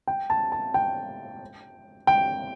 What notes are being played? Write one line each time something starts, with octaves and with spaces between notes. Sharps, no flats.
G5
A5
A5
G5
G5